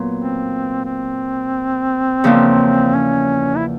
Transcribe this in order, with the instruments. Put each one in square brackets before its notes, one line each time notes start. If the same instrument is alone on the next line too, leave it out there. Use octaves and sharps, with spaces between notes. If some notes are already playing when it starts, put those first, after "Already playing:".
Already playing: [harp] A#2 F#3 B3
[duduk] C4
C4
[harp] E2 C#3 F3 A#3 D4
[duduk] C#4
E4